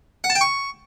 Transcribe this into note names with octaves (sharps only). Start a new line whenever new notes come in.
F#5
A5
G5
C#6